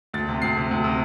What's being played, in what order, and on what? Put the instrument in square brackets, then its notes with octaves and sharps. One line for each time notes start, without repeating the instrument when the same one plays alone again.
[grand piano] D2 A6
C3
D2 C7
C3
D2
C3